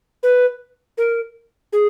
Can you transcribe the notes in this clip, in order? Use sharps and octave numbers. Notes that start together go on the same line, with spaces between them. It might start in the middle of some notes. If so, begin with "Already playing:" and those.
B4
A#4
G#4